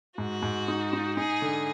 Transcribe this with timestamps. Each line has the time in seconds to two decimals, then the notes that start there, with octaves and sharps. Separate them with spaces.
0.18 G#2 F#4
0.43 G#2
0.68 D#4
0.93 D#4
1.17 D#4 G#4
1.42 D3